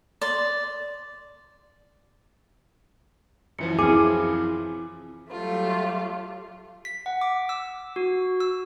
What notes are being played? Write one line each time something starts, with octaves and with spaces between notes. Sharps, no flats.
D5 C6
F#2 E3 F3 C#7
C4 E4 G#4 D6 F6
F#3 G3 A3 F4
B6
F#5
D6
E6
F#4
E6